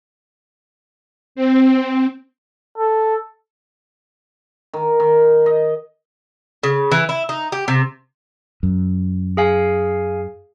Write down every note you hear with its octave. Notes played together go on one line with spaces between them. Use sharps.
C4
A4
D#3
D#3
D#5
C#3
E3
E4
D#4
G4
C3
F#2
G#4 F5 G#5